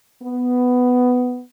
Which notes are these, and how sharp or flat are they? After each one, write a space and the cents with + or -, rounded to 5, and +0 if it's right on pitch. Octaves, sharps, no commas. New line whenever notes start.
B3 +10